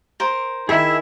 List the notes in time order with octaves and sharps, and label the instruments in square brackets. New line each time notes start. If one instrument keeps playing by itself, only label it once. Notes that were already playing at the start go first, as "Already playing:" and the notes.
[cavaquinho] A#4 C5
[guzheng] D#3 [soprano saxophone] E4 [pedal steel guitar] G#4 E5 B5